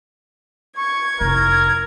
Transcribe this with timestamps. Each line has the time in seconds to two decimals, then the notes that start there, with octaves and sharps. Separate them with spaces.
0.78 C#6 G#6
1.21 F1 E4 A#4